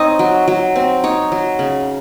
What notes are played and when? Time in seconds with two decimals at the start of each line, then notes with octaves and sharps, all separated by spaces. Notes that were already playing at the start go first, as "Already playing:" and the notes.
Already playing: C4 D#4 C#5 D#5
0.19 F#3
0.48 F#3
0.76 C4
1.04 D#4 C#5
1.32 F#3
1.59 C#3